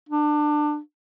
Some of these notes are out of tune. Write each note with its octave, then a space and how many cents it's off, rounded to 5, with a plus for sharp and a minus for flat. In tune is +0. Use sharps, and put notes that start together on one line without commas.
D4 +25